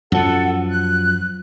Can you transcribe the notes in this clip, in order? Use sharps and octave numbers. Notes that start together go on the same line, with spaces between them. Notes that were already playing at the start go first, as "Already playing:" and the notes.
F#2 F3 A4 F#5
F#6